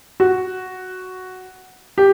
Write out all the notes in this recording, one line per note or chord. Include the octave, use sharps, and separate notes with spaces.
F#4
G4